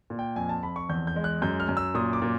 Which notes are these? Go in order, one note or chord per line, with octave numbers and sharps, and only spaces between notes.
A#2
G5
F2 G#5
A5
F2 B5
C#6
E2 G6
G6
G#3
F#6
F#2 G6
F6
F#2
E6
A#2 D#6
D6
A#2